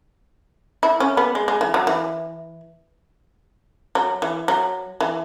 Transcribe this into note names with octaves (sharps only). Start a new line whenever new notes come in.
E4
C#4
B3
G#3
G#3
E3
F#3
E3
F#3
E3
F#3
E3